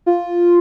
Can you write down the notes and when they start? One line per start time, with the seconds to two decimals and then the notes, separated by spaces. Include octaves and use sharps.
0.06 F4